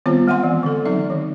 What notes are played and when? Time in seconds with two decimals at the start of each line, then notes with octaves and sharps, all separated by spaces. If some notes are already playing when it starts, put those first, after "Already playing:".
0.06 D#3 G3 B3 C4 F4 C5
0.28 G#3 E5 F#5 G#5 C6
0.43 E3
0.63 D3 A4
0.85 F#3 C4 D#4 D5
1.10 D#3